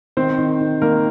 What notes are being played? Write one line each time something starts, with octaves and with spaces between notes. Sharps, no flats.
D#3 C4 C5
D#3
D#3
D#3 A#3 A#4